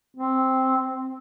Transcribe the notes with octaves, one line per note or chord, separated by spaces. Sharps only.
C4